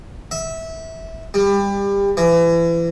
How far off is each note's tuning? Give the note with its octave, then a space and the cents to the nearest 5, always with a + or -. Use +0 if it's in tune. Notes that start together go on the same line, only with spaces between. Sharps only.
E5 -20
G3 +25
E3 +30